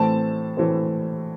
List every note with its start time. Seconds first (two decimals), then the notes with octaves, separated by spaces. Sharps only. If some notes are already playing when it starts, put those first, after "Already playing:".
Already playing: A2 E3 A3 C4 A5
0.57 A2 E3 A3 C4